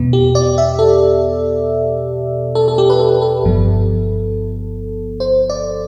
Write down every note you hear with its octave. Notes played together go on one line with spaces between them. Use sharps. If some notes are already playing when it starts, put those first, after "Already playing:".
Already playing: E2 B2 B3
G4
D5
E5
A4
A4
A4
G4
B4
A4
A4
G1 G2 F3 B3
C5
D5